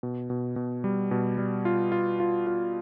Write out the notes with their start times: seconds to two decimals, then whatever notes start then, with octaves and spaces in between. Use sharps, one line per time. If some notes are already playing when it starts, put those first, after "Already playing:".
0.03 B2
0.30 B2
0.56 B2
0.84 G3
1.11 B2
1.38 G3
1.65 F4
1.92 F4
2.20 F4
2.47 F4